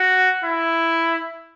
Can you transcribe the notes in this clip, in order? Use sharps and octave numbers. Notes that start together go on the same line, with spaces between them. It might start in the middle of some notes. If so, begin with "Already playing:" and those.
Already playing: F#4
E4